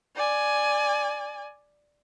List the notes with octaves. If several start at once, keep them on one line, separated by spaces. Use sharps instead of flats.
D5 G#5